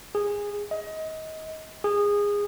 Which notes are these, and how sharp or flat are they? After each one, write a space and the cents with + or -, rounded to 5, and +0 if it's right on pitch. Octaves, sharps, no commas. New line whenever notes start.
G#4 -15
D#5 +25
G#4 -20